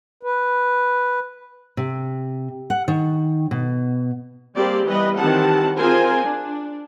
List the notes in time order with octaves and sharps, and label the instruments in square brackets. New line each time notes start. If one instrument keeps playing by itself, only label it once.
[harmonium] B4
[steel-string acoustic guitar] C3
F#5
D#3
B2
[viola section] G3 A#3 C4 G4 G#4 D5
E3 G3 B3 B4 D#5
D#3 E3 C4 G4 F#5 A5
C4 F4 G#4 A#4 C5 G#5
D4